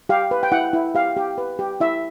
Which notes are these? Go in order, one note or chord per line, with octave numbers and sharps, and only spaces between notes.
G4 F5
B4
G5
E4 F#5
E4
G4 F5
G4
B4
G4
E4 E5